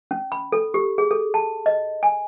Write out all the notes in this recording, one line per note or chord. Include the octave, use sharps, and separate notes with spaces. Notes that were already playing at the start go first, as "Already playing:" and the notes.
C#4
B5
A4
G4
G#4
A4
A5
D#5
G#5